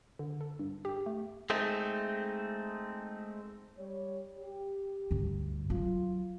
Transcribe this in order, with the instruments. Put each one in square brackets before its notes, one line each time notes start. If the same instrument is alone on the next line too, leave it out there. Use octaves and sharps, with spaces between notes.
[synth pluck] D3
A4
G2
G4
A3
[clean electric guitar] G#3 A3 C4 D#4
[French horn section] G3 C#5
G4
[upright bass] D2 G2
[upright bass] F#3 [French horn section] F4